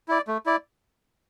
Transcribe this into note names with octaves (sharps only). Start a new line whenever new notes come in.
E4 D5
A3
E4 D5